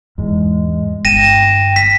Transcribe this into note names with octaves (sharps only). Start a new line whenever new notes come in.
E2 G#2 G#3
G1 G5 A#6 D#7 E7
B6